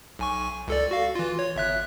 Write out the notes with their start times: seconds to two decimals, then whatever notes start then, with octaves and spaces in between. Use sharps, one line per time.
0.19 B1 G#5 C#6
0.68 C#2 A4 D5
0.91 F#4 F5
1.15 E3 F4
1.39 C#5
1.56 G1 E5 F#6